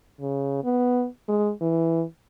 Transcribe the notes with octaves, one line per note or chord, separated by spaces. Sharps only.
C#3
B3
G#3
E3